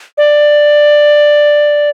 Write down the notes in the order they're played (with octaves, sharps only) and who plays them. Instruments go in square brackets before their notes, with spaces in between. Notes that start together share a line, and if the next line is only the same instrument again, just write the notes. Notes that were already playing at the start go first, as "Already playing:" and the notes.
[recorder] D5